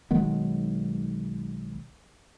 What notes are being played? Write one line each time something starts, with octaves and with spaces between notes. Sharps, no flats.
B1 D#3 G#3 B3